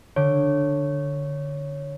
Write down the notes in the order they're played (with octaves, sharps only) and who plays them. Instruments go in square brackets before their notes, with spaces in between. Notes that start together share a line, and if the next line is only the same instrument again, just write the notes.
[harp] D3 [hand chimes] C#5